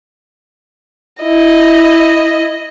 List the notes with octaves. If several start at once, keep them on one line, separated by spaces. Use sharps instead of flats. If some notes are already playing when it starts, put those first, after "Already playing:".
E4 D#5